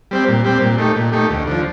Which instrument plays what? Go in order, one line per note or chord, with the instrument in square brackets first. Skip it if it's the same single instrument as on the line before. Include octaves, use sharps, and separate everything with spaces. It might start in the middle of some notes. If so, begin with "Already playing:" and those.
[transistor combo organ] G3 C4 G4
A#2
G3 C4 G4
A#2
A3 D#4 G4
A#2
A3 D#4 G4
D2
D3 F3